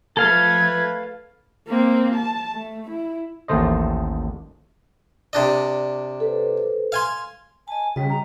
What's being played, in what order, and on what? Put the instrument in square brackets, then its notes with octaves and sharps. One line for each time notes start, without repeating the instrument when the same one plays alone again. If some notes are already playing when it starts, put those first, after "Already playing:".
[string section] F3 A3 [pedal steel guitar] A4 F5 F6 [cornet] B4 [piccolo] G#6
[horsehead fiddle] A#3 C4
A5
A3
E4
[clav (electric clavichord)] A1 D#2 A2 A3 C5 D#5
[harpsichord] C3 D4 D#5
[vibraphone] A4 B4 C5
[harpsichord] F5 G#5 C6
[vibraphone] D#5 A5 [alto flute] G#5
[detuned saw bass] C#3 [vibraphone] G3 D#5 [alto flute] F#4
[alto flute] A#5